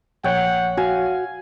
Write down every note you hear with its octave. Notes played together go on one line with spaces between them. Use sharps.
A#1 C#5 F#5 G5
F#4 F5 G#5